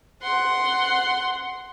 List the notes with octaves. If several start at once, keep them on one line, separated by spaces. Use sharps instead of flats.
F#5 C6